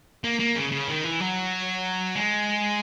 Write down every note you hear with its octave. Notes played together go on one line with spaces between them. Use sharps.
A#3
A#3
C#3
C#3
D#3
E3
F#3
G#3